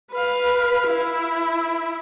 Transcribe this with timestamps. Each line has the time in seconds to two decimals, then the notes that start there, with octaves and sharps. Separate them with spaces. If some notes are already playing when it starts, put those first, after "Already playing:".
0.12 B4 F5
0.89 E4